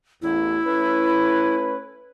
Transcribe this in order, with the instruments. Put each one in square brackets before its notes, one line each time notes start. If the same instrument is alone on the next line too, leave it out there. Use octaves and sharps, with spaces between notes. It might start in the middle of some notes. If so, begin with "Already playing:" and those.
[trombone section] A1 E2 [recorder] E4
[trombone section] A3 C#4 B4